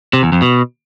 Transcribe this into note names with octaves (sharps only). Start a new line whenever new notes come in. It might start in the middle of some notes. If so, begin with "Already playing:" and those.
C3
E2
F2
B2